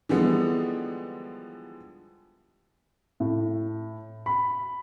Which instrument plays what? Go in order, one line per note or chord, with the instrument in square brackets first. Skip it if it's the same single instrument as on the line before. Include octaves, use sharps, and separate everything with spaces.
[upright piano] D3 E3 F3 G3 G#3 B3
[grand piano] A2
B5